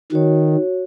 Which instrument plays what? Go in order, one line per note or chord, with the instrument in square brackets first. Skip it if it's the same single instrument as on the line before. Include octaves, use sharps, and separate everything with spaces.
[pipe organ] D#3 [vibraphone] F#4 C#5